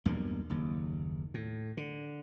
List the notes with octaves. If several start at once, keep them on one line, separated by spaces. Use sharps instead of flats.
B1 E2 G2 A#3
F#1 D#2
A2
D3